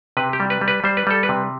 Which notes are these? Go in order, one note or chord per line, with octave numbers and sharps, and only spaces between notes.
C3 B4
G4
G3
B4
G3
B4
G3 C5
B4
G3 A4
B4
C3